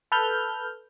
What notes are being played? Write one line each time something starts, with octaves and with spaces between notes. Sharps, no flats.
A4 B4 F6 G6